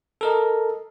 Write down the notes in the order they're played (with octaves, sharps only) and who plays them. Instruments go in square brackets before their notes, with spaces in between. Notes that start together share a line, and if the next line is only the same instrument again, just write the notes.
[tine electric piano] A4 A#4 D#5